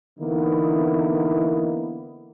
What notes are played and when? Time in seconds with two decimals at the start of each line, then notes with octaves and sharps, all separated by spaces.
0.19 D3 E3 A#3 B3 D#4 E4